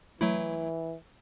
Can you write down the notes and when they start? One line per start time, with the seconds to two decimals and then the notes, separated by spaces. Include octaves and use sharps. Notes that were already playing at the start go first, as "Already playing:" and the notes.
0.21 E3 F#3 A3 E4